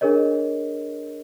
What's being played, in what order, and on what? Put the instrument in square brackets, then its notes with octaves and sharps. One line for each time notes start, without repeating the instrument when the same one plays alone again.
[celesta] D4 G#4 A#4 C#5 D#5